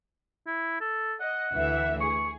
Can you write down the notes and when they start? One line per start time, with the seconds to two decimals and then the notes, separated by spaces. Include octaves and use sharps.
0.47 E4
0.81 A4
1.21 D#5 F#5
1.53 D2 E3 E5
2.01 G#4 C#6